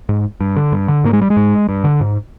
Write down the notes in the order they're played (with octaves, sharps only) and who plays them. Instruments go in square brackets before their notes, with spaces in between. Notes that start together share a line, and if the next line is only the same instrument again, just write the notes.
[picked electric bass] G#2
G2
D3
G2
D3
G#2 A#3
G#3
G3
G#3
G#2
G2
D3
G#2